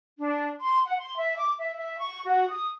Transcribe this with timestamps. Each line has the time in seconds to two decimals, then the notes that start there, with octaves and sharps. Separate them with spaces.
0.19 D4
0.60 C6
0.85 F#5
0.98 C6
1.17 E5
1.37 D6
1.58 E5
1.77 E5
1.98 C#6
2.26 F#4
2.49 D#6